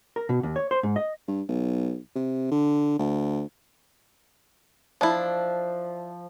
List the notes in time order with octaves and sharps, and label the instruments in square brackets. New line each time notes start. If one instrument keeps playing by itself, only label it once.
[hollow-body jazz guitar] A#4
B2
D#2
C#5
C5
G#2
D#5
[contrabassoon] G2
B1
C3
D3
D2
[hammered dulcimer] F3 [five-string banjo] D4 E4